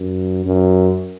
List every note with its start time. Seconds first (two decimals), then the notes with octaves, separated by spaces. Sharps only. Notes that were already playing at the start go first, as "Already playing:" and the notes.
Already playing: F#2
0.45 F#2